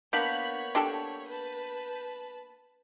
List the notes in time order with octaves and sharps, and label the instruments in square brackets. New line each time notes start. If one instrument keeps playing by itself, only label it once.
[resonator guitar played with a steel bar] A#3 B3 [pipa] D4 [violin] C#5 [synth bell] G6 B6 F#7
[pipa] D4 G4 A4
[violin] B4 A5